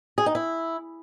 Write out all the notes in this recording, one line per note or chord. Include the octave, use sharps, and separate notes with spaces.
G#4
D#4
E4